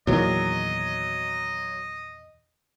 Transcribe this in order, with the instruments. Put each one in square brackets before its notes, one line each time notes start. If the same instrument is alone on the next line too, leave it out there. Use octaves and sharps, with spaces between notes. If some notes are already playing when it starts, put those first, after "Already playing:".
[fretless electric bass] E2 A#2 D#3 [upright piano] F#3 [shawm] D#5